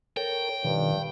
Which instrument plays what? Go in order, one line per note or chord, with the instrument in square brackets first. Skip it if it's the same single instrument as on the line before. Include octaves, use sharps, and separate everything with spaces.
[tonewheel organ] A4 A#4 C#5 [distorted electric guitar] G5
[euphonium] G2 [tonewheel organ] B2 D#3 F3